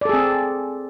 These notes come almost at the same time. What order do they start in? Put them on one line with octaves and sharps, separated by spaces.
D5 A4 G#4 C4